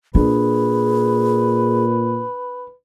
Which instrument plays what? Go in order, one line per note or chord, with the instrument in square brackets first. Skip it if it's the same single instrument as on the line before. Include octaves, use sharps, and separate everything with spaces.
[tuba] A#2 [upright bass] D4 [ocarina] G#4 [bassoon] B4